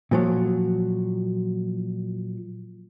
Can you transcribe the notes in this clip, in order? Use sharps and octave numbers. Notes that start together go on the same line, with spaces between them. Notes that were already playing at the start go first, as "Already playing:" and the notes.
A#2 F3 F#3